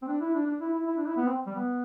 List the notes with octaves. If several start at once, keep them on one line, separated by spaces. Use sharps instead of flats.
C4
D4
E4
D4
D4
E4
E4
E4
D4
E4
B3
C4
G3
B3